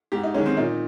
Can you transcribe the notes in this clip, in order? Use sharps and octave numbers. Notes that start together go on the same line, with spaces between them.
G#2 G4
D#4
D#3 G#3 C#4
C4
A#2 D#4